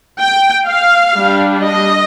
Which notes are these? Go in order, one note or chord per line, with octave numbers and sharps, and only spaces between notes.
G5
F5
G3 D4
D#5